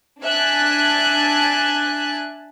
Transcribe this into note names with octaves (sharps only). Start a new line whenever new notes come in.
D4 E5 G#5 A5 F#6